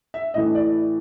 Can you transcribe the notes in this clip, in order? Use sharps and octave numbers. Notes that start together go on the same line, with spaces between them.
E5
A2 E3 D#5
D5